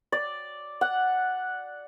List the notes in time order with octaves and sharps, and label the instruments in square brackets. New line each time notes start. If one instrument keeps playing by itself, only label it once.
[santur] D5
F#5